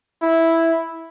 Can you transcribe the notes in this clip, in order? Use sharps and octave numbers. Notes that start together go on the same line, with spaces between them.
E4